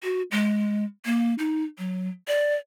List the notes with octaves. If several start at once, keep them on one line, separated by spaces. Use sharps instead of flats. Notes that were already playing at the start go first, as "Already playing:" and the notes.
F#4
G#3
A#3
D#4
F#3
D5